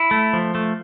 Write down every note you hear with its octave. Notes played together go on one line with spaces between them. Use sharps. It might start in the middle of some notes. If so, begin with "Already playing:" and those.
Already playing: E4
A3
F3
A3